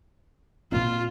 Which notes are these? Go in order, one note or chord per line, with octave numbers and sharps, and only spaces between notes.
A#2 A#3 C4 F4